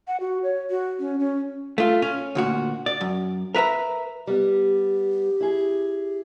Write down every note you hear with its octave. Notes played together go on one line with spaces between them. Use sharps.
F#5
F#4
C#5
F#4
C#4
C#4
A3 F4
C#4
D2 A#2 F#4
D5
F#2
A#4 B4 E5 A#5
G3 B3 G4
E4 G#4